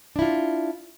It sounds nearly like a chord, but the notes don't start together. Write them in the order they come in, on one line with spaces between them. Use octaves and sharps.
D4 E4 F4